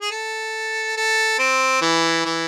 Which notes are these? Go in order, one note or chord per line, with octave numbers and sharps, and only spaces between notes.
G#4
A4
A4
C4
E3
E3